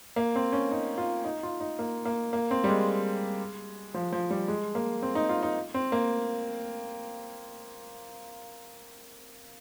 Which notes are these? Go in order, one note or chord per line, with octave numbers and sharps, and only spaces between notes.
A#3
C4
C#4
D#4
F4
D#4
F4
D#4
A#3
A#3
A#3
C4
G3
G#3
F3
F3
G3
G#3
A#3
C4
D#4
F4
D#4
C4
A#3